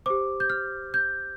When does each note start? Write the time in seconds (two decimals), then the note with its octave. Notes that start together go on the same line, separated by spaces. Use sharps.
0.06 G4 C5 D6
0.40 G6
0.50 F6
0.94 G6